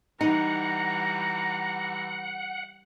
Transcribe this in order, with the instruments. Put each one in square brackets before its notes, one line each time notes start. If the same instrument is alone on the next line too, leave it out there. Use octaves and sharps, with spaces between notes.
[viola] E3 G3 [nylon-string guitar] D#4 [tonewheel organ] F#5 [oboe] A#5